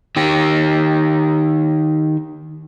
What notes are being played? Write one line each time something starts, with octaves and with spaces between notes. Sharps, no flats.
D#3 G4